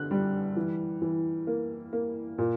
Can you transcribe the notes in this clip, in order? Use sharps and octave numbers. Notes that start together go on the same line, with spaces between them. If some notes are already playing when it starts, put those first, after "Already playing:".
Already playing: D3 F#6
G3
E3
E3
A#3
A#3
A#2